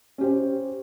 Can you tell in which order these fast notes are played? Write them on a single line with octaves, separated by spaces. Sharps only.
C#4 G4 C5